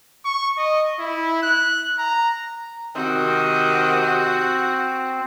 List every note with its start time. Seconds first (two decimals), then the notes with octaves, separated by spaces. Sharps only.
0.25 C#6
0.58 D#5
0.99 E4
1.43 F#6
1.99 A#5
2.95 C3 D#3 C4 F#4